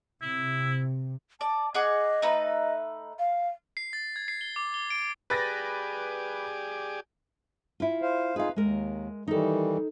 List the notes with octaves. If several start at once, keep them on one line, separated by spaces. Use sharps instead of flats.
C3 E4
D5 A5
G#4 D#5 F#5 D6
A3 D#4 B4
F5
C7
A6
G#6
C7
G7
D6
G7
D7
G4 G#4 B4 D5 A6 A#6
E4 F4
C5 F5
D#4 F4 G#4 B4 F5
D#2 G#3 A#4
D#3 E3 G3 D#4 A4